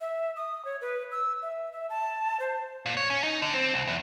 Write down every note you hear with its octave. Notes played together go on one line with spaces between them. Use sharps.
E5
D#6
C#5
B4
E6
E5
E5
A5
C5
A#2
C#5
C#4
D#4
D3
C4
C2
E2